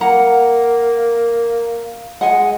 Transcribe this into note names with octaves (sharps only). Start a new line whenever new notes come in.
A#3 F#5 A#5
G#3 F#5 G#5